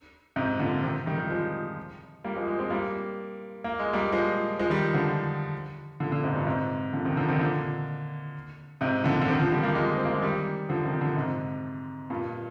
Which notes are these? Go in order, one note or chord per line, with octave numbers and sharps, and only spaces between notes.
G#2 C3
A#2 D3
C3 D#3
D#3 G3
D#3 G3
F3 G#3
G3 A#3
F3 G#3
F3 G#3
G#3 C4
G3 A#3
A#3
G#3
G3 A#3
F3 G#3
F3 G#3
D#3 G3
D3 F3
A#2 D3
A#2 D3
G#2 C3
G2 A#2
G#2 C3
A#2 D3
C3 D#3
D3 F3
C3 D#3
A#2 D3
G#2 C3
A#2 D3
D3
C3 D#3
D3 F3
D#3 G3
G3 A#3
F3 G#3
C4
A#3
G#3
D#3 G3
D3 F3
C3 D#3
A#2 D3
G#2 C3
G2 A#2